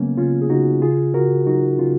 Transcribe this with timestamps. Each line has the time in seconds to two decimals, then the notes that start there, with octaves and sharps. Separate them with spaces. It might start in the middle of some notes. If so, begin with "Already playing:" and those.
Already playing: C#3 F#3 G#3 A#3 B3 C#4
0.17 C#3 C#4 F4
0.42 G#4
0.50 C#3 D#4 F#4
0.82 C#3 F4 G#4
1.14 C#3 F#4 A#4
1.46 F#3 D#4 F#4
1.79 C#3 C#4 F4